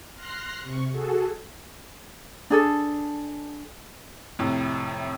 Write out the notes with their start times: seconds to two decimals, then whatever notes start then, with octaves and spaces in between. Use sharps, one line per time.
0.15 C6 F6 F#6 A#6 C7
0.61 C3 C#6
0.92 F#4 G#4 A4
2.50 D4 G#4 A4
4.39 F2 A2 C3